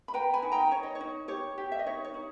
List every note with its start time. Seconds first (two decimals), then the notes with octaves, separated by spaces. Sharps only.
0.08 B5
0.14 B4 G5 A#5
0.33 G#5 B5
0.42 D#4
0.52 G5 A#5
0.71 D#4 C#5
0.83 D#5
0.95 C#5
1.01 D#4
1.28 G4 C#5
1.58 G4
1.72 E5
1.79 D#5
1.86 D#4 C#5
2.05 C#5
2.14 D#4